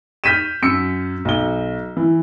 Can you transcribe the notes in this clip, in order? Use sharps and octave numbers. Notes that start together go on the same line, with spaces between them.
F6 G6 B6 D#7 E7
F#2 E6 C#7
B1 G7
E3